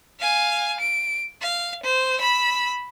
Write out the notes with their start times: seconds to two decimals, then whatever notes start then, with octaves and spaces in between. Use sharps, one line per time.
0.20 F5 G#5
0.80 D7
1.42 F5
1.83 C5
2.18 B5 E6